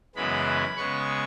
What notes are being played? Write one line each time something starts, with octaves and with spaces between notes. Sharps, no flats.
F#2 C#3 E3 G#3 B3 B5
C#3 G#3 B3 C#6